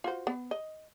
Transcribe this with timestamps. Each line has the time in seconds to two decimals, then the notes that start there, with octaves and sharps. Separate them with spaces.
0.04 F4 F#4 C5
0.27 B3
0.51 D#5